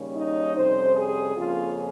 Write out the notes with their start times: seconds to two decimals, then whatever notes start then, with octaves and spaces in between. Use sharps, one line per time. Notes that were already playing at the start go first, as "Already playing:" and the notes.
Already playing: D#2 C#3 G3 C#4
0.16 D#4
0.56 F2 C3 G3 C#4 C5
0.96 G#4
1.36 F2 C#3 F3 A#3 C#4 F4